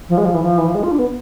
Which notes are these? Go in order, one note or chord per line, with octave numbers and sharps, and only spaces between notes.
F3
G#3
F3
E3
F3
E3
F3
G#3
F4
D4
B3